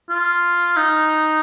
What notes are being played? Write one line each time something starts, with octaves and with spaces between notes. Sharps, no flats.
F4
D#4